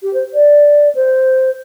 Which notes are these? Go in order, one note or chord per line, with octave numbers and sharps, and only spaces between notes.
G4
C5
D5
C5